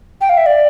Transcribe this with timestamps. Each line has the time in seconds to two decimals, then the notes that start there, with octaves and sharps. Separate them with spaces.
0.21 G5
0.29 F5
0.37 E5
0.46 D5